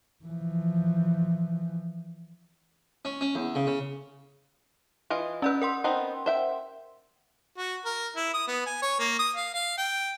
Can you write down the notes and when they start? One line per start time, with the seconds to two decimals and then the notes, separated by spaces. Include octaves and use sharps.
0.25 E3 F3
3.05 C#4
3.21 C#4
3.35 E2
3.55 C#3
3.67 C#3
5.10 E3 F4 D#5
5.42 C#4 D#4 B4 D5 E6
5.62 A#4 F#5 C6
5.84 B3 C4 D#4
6.26 C5 E5 G5
7.57 F#4
7.86 A#4
8.16 E4
8.34 D#6
8.48 B3
8.66 G#5
8.82 C#5
8.99 A#3
9.19 D#6
9.36 F5
9.54 F5
9.78 G5